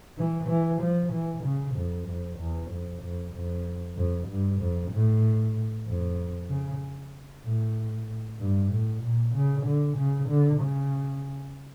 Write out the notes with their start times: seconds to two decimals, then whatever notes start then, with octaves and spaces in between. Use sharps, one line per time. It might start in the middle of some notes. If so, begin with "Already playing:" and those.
0.18 E3
0.49 E3
0.82 F3
1.12 E3
1.44 C#3
1.76 F2
2.08 F2
2.39 E2
2.71 F2
3.03 F2
3.34 F2
3.96 F2
4.29 G2
4.61 F2
4.92 A2
5.87 F2
6.49 C#3
7.45 A2
8.39 G2
8.72 A2
9.03 A#2
9.35 C#3
9.66 D3
9.97 C#3
10.29 D3
10.60 C#3